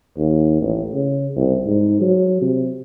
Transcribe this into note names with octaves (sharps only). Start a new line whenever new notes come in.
D#2
A1
C#3
C2
G#2
F#3
C3